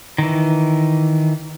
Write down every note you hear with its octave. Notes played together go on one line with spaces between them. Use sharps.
D#3 E3